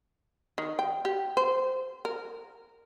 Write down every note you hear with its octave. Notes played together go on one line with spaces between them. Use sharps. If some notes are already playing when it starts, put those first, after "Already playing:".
D#3
G5
G4
C5
A#4